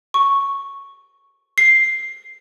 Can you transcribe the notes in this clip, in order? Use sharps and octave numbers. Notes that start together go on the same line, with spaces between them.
C#6
C7